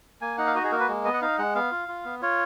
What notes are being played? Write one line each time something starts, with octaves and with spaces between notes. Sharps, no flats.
A#3 G#5
D#4 F#5
F5
F#4 D#5
G#4
A#3 A#4
B4
G#3
B3 D#5
F#5
D#4 F5
G#3 F#5
B3 F5
F4
F4
B3
F4 C#5